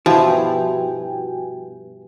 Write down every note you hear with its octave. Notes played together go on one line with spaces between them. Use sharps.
G2 B2 F3 E4 F#4 G5 G#5